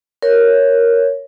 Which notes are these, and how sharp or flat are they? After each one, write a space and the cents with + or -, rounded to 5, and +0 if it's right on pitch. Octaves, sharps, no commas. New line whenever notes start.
A#4 +0 C#5 +0